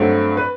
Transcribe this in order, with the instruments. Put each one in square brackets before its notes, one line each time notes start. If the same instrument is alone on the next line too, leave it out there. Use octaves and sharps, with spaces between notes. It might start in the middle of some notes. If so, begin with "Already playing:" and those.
Already playing: [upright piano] G2 F#3 A3 C4
B4